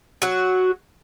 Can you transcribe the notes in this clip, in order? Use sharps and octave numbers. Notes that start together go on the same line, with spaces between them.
F#3 F#4